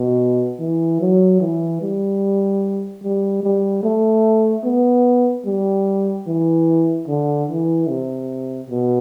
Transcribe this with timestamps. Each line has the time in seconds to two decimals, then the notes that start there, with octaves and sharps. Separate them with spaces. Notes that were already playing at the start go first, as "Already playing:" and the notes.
Already playing: B2
0.60 E3
1.01 F#3
1.41 E3
1.81 G3
3.03 G3
3.43 G3
3.83 A3
4.64 B3
5.46 G3
6.27 E3
7.08 D3
7.50 E3
7.89 C3
8.70 B2